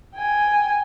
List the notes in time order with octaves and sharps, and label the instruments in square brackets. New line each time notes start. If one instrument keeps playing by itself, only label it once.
[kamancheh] G5 G#5